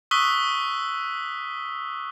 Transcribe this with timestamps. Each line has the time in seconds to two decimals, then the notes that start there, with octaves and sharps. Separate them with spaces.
0.11 C#6 D#6 E6 F#6 B6 G7